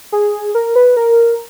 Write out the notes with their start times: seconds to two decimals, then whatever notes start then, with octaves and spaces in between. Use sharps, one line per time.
0.12 G#4
0.55 A#4
0.76 B4
0.97 A#4